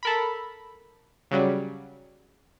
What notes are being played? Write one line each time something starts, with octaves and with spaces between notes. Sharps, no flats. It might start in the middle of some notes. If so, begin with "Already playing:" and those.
A4 A#4 B5
C#3 F#3 G3